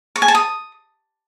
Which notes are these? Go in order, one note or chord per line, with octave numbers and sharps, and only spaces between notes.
C#6
G#5
A5
D#6